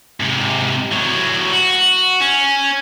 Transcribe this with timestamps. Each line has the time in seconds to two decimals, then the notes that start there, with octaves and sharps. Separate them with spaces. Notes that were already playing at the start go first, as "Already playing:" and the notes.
0.20 G#2 C3
0.91 A2 F#3
1.52 F#4
2.21 C#4